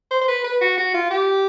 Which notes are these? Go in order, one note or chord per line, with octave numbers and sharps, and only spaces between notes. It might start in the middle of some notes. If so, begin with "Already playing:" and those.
C5
C5
B4
B4
F#4
F#4
F4
G4